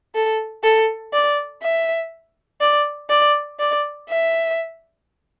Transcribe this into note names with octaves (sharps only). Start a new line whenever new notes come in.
A4
A4
D5
E5
D5
D5
D5
E5